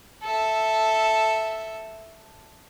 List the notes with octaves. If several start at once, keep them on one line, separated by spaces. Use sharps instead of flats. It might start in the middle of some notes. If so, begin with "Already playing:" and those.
A4 E5